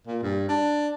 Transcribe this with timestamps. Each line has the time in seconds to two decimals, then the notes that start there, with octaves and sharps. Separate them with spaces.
0.07 A#2
0.22 G2
0.49 D4